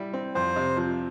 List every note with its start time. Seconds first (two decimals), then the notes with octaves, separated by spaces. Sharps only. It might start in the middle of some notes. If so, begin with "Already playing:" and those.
Already playing: G3 E4
0.14 C4
0.35 F2 C5
0.56 C3
0.77 F3